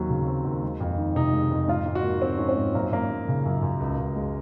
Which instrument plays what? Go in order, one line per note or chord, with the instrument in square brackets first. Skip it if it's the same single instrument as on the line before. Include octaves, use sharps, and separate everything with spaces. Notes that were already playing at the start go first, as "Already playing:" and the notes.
Already playing: [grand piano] D#2 D#3 F#3 C4 [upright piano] F#4
[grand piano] C#3
C4
D#2
G#3
F2
D#3
[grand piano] C3 [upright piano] D#4
[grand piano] G#3
F2
[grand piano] G#2 [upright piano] F4
[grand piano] G#2
[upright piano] F#4
[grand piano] A#3
[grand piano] F3 [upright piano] C4
[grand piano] G#2 [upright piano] C#4
[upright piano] C4
[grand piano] G#2
[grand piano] F#2 [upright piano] A#3
[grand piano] F#2 [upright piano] A#3
[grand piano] F3
C#3
F#2
F#2
C#2
C#2
G#3